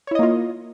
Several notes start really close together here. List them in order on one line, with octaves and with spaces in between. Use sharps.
C#5 E4 D#5 A#3 F4